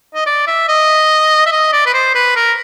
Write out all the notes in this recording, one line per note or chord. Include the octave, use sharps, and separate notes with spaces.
D#5
D5
E5
D#5
E5
D#5
D5
B4
C5
B4
A#4